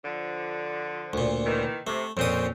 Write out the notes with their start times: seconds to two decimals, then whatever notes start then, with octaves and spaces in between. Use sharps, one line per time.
0.05 D3 F3
1.13 D2 A#2
1.46 D#3 E3
1.87 C3 A3
2.17 F2 A#2 C4 C#4 D#6